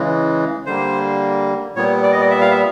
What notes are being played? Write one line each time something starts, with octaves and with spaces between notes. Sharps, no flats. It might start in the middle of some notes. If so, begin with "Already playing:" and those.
Already playing: C#3 E3 G#3
D3 G3 A#3 C5
A#2 G3 B3 C#5
D5
D#5
D5
E5
F5
E5